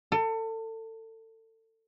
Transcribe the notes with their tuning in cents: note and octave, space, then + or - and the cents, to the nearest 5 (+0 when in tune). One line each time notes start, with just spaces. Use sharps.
A4 +30